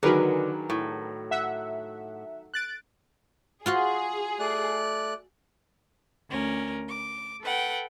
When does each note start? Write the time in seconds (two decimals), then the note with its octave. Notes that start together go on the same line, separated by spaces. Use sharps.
0.03 D3 D#3 F#3 G#4 A#4 B4
0.70 A2
1.31 E5 F#5
2.54 F#6 A6 D7
3.66 F4 F#4 G#4 F5
4.39 A3 D5 F#6
6.30 D2 C#4 A#4
6.89 D6
7.42 A4 B4 F#5 G5